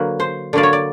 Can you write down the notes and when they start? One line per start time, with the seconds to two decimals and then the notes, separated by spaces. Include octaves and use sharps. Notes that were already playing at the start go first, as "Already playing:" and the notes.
Already playing: D3 F#3 A#3 B4
0.20 C5
0.53 D3 F#3 A#3 D5
0.63 C#5
0.73 D5